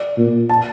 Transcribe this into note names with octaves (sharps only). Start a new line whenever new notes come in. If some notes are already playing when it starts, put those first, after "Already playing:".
Already playing: D5
A#2
A5